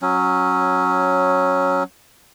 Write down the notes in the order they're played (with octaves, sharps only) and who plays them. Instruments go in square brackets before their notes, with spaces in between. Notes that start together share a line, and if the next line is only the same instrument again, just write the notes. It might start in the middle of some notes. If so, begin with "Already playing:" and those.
[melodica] F#3 C#4